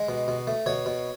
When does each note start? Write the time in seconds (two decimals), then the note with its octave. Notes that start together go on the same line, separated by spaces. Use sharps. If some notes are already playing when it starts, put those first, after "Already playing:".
Already playing: G#3
0.09 B2
0.28 B2
0.47 A3
0.66 B2 C#5
0.86 B2